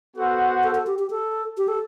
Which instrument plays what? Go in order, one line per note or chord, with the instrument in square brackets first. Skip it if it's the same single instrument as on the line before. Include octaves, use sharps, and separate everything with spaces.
[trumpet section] B3 F#4 C5 F#5 [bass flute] A4
[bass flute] A4
A4
G4
G4
A4
G4
A4